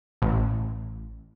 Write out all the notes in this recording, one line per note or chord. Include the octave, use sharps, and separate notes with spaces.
A1